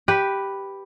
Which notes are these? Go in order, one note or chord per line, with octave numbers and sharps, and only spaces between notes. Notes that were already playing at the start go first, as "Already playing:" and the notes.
G4 B4